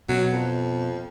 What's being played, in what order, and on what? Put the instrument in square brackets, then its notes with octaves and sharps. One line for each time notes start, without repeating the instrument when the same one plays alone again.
[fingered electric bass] B2 [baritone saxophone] F#3
[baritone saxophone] F2